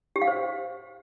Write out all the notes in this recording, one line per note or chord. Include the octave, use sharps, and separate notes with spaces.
G4
F5
C5